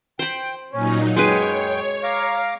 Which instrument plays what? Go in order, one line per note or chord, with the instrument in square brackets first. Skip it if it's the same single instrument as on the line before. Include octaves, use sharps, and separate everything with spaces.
[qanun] C5 B5 [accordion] G5
[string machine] A#2 F#3 D#4 [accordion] C#4
[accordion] F#2 G5 [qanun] G#3 G#4 B4 [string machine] C#5
[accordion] F5 A#5 D6